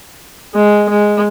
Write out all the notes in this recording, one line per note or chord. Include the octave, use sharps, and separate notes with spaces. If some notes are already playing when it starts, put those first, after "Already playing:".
G#3
G#3